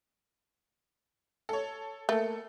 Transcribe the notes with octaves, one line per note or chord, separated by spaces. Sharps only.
A4 C#5
A3 A#3 A4